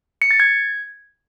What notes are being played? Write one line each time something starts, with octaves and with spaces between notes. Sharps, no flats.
C#7
A6
G#6